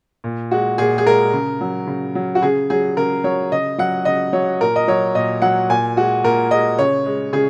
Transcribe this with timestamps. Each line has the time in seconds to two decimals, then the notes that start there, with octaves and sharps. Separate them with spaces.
0.24 A#2
0.51 G#3 F#4
0.78 A#2 G#4
0.98 G#4
1.06 G#3 A#4
1.33 C#3
1.61 F#3
1.87 C#3
2.15 F#3
2.35 F#4
2.42 C#3 G#4
2.70 F#3 G#4
2.97 C#3 A#4
3.24 F#3 C#5
3.52 C#3 D#5
3.78 F#3 F#5
4.05 C#3 D#5
4.33 F#3 C#5
4.61 A#2 A#4
4.76 D#5
4.88 F#3 C#5
5.15 A#2 D#5
5.42 F#3 F#5
5.69 A#2 G#5
5.96 G#3 F#4
6.24 A#2 A#4
6.51 G#3 D#5
6.79 C#3 C#5
7.06 G#3
7.33 C#3 G#4